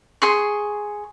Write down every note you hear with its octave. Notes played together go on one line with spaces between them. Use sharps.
G#4 C6 C#6